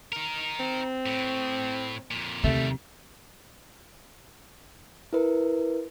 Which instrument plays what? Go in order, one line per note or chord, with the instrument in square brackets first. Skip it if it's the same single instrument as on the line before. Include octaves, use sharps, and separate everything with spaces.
[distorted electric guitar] D#4 A#4
[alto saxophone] C4
[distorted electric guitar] A2
F2 A#2
[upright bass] D#2 C3 [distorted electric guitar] G#2 G3 [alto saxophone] A3
[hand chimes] E4 A#4 B4